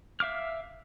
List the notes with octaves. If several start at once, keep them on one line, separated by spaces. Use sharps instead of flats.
E5 F5 D6 F6